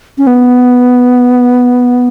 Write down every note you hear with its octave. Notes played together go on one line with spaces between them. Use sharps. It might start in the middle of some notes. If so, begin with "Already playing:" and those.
C#4
B3